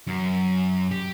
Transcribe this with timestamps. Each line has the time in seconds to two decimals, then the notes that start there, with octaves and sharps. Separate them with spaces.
0.07 F#2
0.91 G4